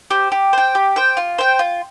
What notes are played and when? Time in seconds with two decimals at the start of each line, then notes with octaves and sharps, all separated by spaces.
0.11 G4 C5
0.32 G4
0.53 C5 G5
0.75 G4
0.96 C5 G5
1.17 F4
1.38 C5 G5
1.59 F4